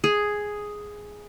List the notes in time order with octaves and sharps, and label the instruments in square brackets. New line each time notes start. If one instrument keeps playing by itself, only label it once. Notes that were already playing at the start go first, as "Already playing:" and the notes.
[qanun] G#4